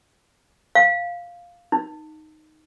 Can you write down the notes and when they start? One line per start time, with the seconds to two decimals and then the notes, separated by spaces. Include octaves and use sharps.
0.75 F5
1.72 D#4